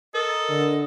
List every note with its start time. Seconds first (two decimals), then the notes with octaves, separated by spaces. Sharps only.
0.14 A4 A#4 D#5
0.50 D3